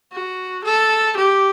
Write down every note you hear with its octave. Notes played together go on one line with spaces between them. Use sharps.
F#4
A4
G4